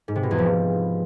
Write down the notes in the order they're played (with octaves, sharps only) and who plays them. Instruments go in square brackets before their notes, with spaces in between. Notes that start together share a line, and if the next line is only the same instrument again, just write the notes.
[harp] G#2
C3
B2
E2
F3